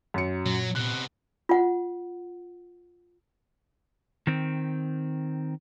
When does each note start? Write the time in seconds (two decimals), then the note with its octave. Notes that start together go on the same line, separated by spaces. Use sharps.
0.14 F#2 C#7
0.46 A#2 F#3
0.75 C3 B3 F#6
1.49 F4 F#5
4.27 D#3 C4